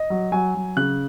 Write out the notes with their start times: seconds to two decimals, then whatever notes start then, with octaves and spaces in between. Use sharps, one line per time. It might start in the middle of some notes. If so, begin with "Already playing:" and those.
Already playing: D#5
0.10 F#3
0.32 F#3 G#5
0.55 F#3
0.77 C#3 F#6